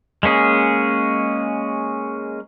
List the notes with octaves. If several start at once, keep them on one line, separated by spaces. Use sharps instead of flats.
G#3 A#3 C#4 G#4